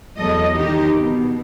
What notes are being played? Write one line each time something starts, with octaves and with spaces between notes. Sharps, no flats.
E2 F#3 A4 D#5
D#3 D#4 G4
B2